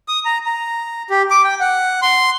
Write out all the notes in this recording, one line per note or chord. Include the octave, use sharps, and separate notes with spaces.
D#6
A#5
A#5
G4
D6
G5
F#5
C6